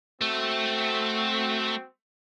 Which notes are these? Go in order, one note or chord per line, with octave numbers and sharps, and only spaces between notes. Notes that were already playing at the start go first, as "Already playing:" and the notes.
A3 C4 F#4